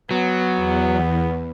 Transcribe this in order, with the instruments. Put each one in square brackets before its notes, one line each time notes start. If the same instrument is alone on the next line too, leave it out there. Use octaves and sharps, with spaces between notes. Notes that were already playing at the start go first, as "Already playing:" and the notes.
[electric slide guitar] F#3 [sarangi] B3
[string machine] E2